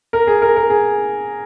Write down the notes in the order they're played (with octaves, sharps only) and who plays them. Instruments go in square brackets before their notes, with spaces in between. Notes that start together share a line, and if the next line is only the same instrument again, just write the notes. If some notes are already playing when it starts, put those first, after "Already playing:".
[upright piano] A#4
G#4
A#4
A#4
G#4